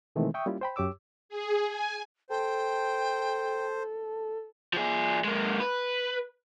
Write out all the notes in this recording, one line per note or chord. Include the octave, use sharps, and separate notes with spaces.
B2 D#3 E3 G#3 A3 C4
E5 G5 C#6 D#6
G3 A#3 C#4 E4 F4 G4
C5 G5 B5
F#2 G4 C#5 D6 E6
G#4
G#5
A4 C5 G5
F3 G#4
G#3 A#3
B4